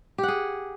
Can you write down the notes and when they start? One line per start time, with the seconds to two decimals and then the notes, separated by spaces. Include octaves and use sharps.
0.18 G4
0.23 F#5
0.28 G#4